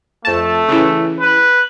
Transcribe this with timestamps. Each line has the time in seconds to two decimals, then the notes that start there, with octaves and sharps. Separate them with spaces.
0.25 F2 A3 A5
0.68 C#3 E3
1.20 B4